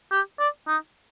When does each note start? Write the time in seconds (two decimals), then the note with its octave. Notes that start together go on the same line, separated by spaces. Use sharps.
0.12 G4
0.39 D5
0.68 D#4